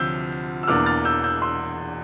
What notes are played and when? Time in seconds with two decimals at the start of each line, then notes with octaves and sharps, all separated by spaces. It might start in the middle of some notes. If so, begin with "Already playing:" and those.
Already playing: D2 C3 F3 E6 G6
0.63 E6
0.68 E1 E2 E3 A#3 D4 D6 F6
0.86 F6 A6
1.05 E6 G6
1.24 E6 G6
1.42 C6 E6